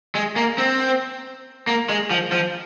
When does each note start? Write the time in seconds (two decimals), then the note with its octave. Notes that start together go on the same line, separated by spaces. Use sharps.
0.15 G#3
0.36 A#3
0.58 C4
1.67 A#3
1.89 G#3
2.11 F3
2.32 F3